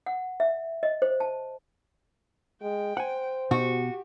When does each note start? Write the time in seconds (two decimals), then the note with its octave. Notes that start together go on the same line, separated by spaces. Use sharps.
0.06 F#5
0.40 E5
0.83 D#5
1.02 C5
1.20 A5
2.62 G#3 G5
2.97 C5 F#5 G#5
3.51 B2 F#4 G4